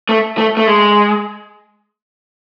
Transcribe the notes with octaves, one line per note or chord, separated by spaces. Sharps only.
A3
A3
A3
G#3